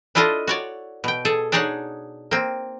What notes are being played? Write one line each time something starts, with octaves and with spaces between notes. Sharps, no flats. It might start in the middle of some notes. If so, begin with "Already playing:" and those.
D4 E4 F4 A4 D#5
F#4 C#5 D5
B2 G5
G#4 A4
D4 D#4 G#4 C#5 F#5
A#3 C4